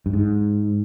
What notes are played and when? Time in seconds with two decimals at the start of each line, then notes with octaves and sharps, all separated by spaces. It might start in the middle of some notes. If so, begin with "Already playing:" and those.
0.06 G2
0.13 G#2